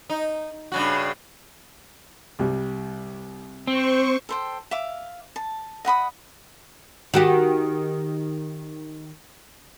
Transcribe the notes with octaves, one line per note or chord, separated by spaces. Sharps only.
D#4
G2 C#3 F#4
C2 G3
C4 C5 C#6
A4 C5 G5
E5 F5 D6
A5
D#5 F#5 B5 D#6
D#3 F#4 G4